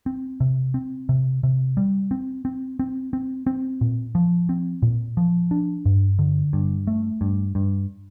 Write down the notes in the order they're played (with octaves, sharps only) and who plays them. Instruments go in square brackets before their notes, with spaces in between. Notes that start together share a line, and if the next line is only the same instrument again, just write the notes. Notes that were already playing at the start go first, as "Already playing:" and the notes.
[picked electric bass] C4
C3
C4
C3
C3
G3
C4
C4
C4
C4
C4
A#2
F3
C4
A#2
F3
D4
G2
D3
G2
A3
G2
G2